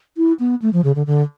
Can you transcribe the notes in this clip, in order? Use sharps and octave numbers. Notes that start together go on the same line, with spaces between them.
E4
B3
A3
F3
C#3
D3
D3